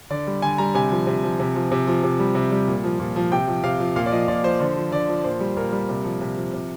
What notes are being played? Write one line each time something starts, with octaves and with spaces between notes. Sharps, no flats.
D3 D5
G3
D3 G#5
G3 A#5
C3 G#5
F3
C3
F3
C3
F3
C3
F3
C3
G3
C3
G3
A#2
F3
A#2
F3
C3 G5
F3
C3 F5
F3
A#2 F5
D5
F3 D#5
A#2 D5
F3 C5
D3 C5
F3
D3 D5
F3
A#2 C5
G3
A#2 A#4
G3
C3
F3
C3
F3
C3